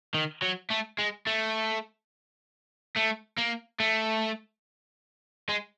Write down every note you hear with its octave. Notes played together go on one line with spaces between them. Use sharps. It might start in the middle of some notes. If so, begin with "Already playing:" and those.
D#3
F#3
A3
G#3
A3
A3
A#3
A3
G#3